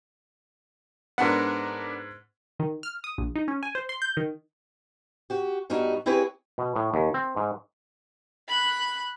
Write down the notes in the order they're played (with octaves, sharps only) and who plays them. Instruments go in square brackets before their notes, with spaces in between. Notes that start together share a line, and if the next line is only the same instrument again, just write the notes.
[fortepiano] G#2 F#5 [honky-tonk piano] B3 D4 A#4
[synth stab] D#3
F6
D#6
A#1
D#4
C#4
G#5
C5
C6
G6
D#3
[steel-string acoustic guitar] F#4 G4
G2 G3 B3 D#4 F#4
C4 E4 G4 G#4 B4 C#5
[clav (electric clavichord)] B2
A2
D#2
C4
G#2
[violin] B5 F#6